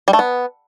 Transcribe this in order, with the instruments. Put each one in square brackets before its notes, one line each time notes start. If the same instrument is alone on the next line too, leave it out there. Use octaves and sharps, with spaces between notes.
[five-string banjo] G3
A3
B3